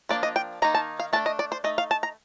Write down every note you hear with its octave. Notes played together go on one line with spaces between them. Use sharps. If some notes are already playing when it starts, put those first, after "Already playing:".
F3 A#3 D4 D5
D#5
G5
D#3 A#3 D#4 A#5
A5
F5
A3 D4 A5
D#5
D5
C5
A3 D#4 D#5
F5
A5
A#5